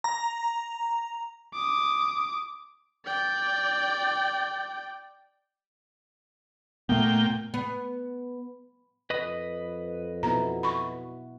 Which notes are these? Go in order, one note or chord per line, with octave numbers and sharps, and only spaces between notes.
A#5
D6 D#6
D5 G5
A#2 A3 B3 G5
B3
F2 B4 D#5
B2 B3 E4 A#5
B5 C#6